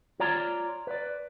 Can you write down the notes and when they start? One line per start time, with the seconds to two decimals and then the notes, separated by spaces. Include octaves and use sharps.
0.20 F4 C#5 D5 A#5
0.87 B4 D5